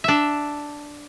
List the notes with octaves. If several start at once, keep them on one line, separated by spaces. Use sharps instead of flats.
D4 E5